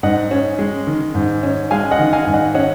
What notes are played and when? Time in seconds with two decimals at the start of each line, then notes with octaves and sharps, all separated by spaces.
0.03 G#2 D#5 F#5
0.31 C#4
0.59 G#3
0.87 D#3
1.15 G#2
1.43 C#4
1.71 G#3 F5 G#5
1.91 D#5 F#5
1.99 D#3
2.13 F5 G#5
2.26 G#2
2.33 D#5 F#5
2.54 C#4 D#5 F#5